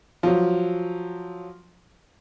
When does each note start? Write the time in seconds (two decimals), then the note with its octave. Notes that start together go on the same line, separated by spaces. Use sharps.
0.23 F3 F#3